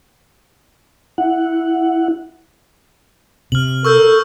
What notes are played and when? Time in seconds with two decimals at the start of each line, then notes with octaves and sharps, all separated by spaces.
1.18 E4 F#5
3.52 C3 F6 F#7
3.85 A4 A#4 C#6 E6 G6